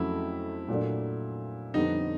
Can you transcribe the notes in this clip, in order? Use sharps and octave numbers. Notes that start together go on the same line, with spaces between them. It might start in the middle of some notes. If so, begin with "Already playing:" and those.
Already playing: F2 C#3 F#3 A3 C#4 E4
A#2 F#3 A3 D4
F2 D3 G3 B3 D#4